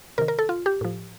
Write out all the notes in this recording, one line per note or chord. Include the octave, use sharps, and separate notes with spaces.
C3 D#3 A#4
A#4
A4
F4
G4
A2 F3